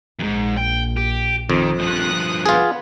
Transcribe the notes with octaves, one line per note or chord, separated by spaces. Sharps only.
A#1 F2 G#2
G5
G4
F2 D#3
G2 F3 D#6 F#6
B3 F4 G#4